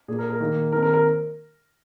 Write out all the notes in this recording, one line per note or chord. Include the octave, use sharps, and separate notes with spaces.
A#2 A#3 G#4
A#4
A#4
D#3 A#3
D#3 C4 A#4
A#4
A#4